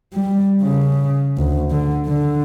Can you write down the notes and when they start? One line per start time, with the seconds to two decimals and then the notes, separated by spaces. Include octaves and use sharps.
0.14 G3
0.63 C#3
1.38 D2
1.70 D3
2.06 D3